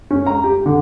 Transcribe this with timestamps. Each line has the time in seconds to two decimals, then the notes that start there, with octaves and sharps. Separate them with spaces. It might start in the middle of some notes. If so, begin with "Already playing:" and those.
0.11 C#4
0.26 A#5
0.44 G4
0.66 D3